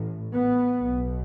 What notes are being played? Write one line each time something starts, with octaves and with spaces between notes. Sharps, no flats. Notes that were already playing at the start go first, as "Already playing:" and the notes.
Already playing: A1 A2
B3
B1 B2